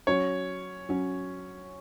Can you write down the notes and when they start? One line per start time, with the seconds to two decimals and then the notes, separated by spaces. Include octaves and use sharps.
0.07 F#3 C#4 C#5
0.89 F#3 C#4